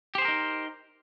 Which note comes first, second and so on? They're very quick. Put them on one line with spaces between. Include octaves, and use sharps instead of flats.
G4 C5 G#4 A#4 D#4